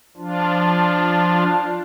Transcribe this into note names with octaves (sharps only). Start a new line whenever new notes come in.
F3 D4 F4